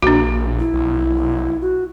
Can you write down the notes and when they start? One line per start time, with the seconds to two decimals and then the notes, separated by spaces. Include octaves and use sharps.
0.02 A#1 A#3 D4 F#4
0.59 E4
0.73 B1
1.61 F#4